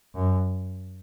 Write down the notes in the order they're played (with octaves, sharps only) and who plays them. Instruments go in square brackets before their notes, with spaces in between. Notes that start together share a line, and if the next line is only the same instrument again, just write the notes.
[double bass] F#2